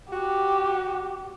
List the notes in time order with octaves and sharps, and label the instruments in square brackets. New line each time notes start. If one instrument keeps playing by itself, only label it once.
[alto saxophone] F#4 [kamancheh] G4